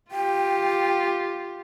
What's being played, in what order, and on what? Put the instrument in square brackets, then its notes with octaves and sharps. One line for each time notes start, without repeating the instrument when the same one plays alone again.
[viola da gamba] F4 G4 [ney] G5